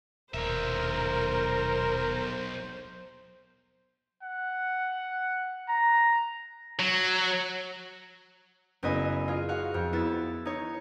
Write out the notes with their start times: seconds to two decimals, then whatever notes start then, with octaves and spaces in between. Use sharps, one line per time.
0.34 D#1 B1 A#4 C5 E5
4.23 F#5
5.69 A#5
6.79 F#3
8.83 F#1 F#2 B3 E4 D#5 G#5
9.28 F4 G#4
9.49 F#4 F5 F#5
9.74 F2
9.93 B3 E4 A6
10.45 D#4 C#5